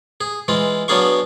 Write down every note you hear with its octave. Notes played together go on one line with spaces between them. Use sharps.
G#4
E3 G#3 F4
F#3 B3 D4 G#4 F5 C#6